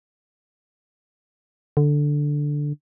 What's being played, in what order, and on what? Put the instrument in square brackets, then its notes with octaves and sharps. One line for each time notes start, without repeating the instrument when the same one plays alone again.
[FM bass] D3